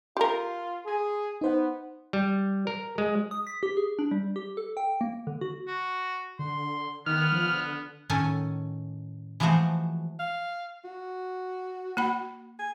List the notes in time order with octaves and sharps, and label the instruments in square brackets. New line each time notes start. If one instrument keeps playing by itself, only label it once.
[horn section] F4 [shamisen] G4 A#4 [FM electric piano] C6
[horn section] G#4
[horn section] B3 [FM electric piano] D#4 C5 F#5
[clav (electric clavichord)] G3
A#4
G#3
[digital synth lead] D#6
B6
G4
G#4
D4
G3
G4
A4
G5
A#3
D3
F#4
[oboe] F#4
[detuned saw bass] D3 [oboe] C6
[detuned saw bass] D#3 [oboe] B3 [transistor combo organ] F6
[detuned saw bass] F3
D3
[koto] A2 D#3 C#4 A4 C#5 G#5
E3 F3 G#3 A3 F#4 C5
[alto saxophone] F5
F#4
[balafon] A#3 F#5 B5
[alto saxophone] G#5